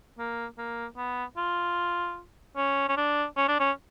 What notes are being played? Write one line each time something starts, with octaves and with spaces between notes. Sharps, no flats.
A#3
A#3
B3
F4
C#4
C#4
D4
C#4
D4
C#4